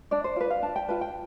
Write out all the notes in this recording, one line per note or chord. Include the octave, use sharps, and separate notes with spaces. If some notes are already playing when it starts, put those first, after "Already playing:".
D4 D5
C5
F4 B4 D5
F5
D4 A5
G5
F4 B4 A5
G5